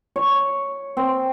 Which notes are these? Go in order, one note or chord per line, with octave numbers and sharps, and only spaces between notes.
C#5
C4